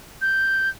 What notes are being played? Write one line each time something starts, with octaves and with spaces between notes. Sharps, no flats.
G6